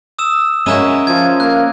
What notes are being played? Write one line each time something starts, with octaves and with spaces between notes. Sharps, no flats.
D#6 E6 E7
G#3 C#4 E4 F#4 A#4 A#5 D#7
F3 G#6
A#3 F#6